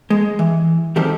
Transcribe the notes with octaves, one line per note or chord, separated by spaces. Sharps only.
G#3
E3
D#3 F3 G3 C4 G4 A4